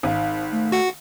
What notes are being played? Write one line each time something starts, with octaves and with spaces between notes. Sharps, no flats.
G#1 D#4 C5 F5
A3
F#4 F#5